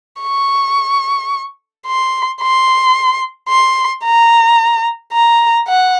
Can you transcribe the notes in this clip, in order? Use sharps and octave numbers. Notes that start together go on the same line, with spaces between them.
C#6
C6
C6
C6
A#5
A#5
F#5